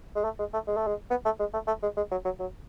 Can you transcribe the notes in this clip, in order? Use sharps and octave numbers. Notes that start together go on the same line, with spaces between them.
G#3
A3
G#3
A3
G#3
A3
G#3
B3
A3
G#3
A3
A3
G#3
G#3
F#3
F#3
F#3